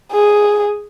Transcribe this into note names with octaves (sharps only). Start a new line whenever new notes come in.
G#4